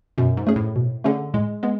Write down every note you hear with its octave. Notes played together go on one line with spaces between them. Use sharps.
F#2 B2
G#2
A3 C#4 G#4
A2
B2
D3 A3 C#4 G#4
A2 G#3
G#3 B3